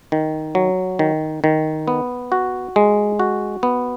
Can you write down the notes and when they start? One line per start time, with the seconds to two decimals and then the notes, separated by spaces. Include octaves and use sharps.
0.12 D#3
0.55 F#3
0.99 D#3
1.44 D#3
1.88 B3
2.32 F#4
2.76 G#3
3.19 F#4
3.63 B3